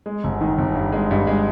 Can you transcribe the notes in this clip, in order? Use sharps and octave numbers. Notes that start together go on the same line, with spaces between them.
G#3
G1
D#3
G1
G2
G#3
G2
G#3